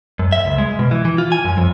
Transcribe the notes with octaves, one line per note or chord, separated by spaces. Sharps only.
F#2
E5
C#2
G#3
B2
E3
E3
F4
G#5
F#2
F2